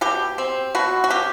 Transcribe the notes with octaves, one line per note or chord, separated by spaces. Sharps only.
B2 G4
C4
B2 F#4
F#4
B2 G4